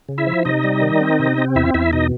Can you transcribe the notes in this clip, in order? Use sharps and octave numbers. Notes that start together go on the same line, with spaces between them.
C#3
E4 E5
F3
C3 D#4 D#5
G3
D#3
C4
C3
C4
E2 E4 E5
E2 E4 E5
B2 D#4 D#5